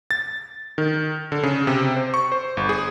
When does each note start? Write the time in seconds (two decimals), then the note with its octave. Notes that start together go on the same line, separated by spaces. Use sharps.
0.11 A6
0.78 D#3
1.32 D3
1.43 C#3
1.67 C3
1.96 C5
2.14 C#6
2.32 C5
2.57 G1
2.69 G#4